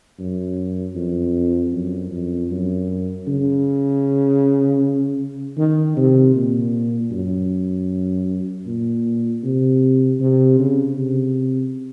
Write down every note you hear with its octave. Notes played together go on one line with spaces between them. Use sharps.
F#2
F2
F#2
F2
F#2
C#3
D#3
C3
A#2
F#2
A#2
C3
C3
C#3
C3